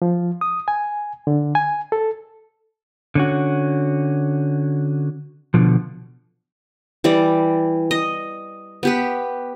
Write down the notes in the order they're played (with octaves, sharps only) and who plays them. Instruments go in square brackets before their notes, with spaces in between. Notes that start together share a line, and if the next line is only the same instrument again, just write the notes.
[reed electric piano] F3
D#6
G#5
D3
G#5
A4
[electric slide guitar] D3 C#4 F#4
B2 D3 F3
[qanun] E3 G3 D5
D#5
B3 G4 B4